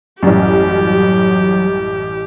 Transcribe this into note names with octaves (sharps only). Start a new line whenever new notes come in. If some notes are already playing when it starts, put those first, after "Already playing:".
A1 F#2 F#3 G3 G4